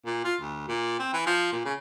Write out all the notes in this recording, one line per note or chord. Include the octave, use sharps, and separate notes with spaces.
A#2
F4
D2
A#2
C4
E3
F3
A#2
C#3